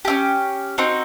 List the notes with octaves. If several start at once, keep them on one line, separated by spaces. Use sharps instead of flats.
C#4 E4 G4
C4 D#4 F#4